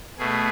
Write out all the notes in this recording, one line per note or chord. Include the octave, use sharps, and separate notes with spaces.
B2 A3 G#4